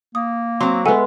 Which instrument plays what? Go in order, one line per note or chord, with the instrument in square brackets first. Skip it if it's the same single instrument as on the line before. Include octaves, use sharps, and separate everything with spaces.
[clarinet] A#3 [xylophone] D#6
[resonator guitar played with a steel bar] F#3 C4 [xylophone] C6
[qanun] G#3 B3 [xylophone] A4 F#5 G#5 [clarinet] E5